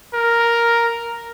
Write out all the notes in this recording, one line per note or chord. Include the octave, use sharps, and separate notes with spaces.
A#4